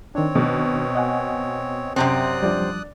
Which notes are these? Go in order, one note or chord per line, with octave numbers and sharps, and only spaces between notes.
D#3 C4 D4 C#5
B2
D#5 F#5 G#5
F#2 C3 C4 D5 D#6 F#6
F3 G3 D4